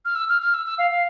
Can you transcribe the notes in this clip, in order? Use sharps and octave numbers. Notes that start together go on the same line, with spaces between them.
F6
E6
F6
F6
E6
E6
F5
F5